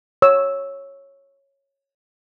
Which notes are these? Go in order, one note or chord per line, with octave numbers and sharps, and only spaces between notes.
C#5 E6